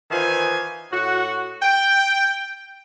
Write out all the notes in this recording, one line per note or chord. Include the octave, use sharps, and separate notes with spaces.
D#3 E3 F4 C5 G#5
A2 F#4
G5